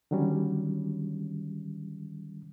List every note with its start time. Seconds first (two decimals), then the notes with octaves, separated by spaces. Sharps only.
0.11 D3 D#3 F#3 G3 C#4